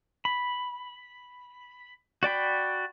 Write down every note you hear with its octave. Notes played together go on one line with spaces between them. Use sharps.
B5
F#4 D5 G5 B5